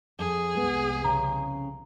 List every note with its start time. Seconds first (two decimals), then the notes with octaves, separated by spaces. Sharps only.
0.19 F2 G#4
0.55 C2 F2 G#3 B3
1.05 C#3 A#5